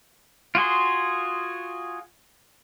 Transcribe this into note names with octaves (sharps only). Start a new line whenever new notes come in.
F4 F#4 G#4 C6